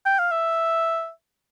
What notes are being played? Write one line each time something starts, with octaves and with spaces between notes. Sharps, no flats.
G5
F5
E5